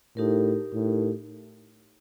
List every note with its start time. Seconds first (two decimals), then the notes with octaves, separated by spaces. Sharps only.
0.16 A2 D#4 G4 A#4
0.73 A2